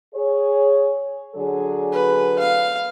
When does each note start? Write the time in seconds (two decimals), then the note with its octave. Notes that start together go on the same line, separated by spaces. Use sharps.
0.15 G#4 C#5
1.35 D3 F#3 G#4
1.92 B4
2.39 F5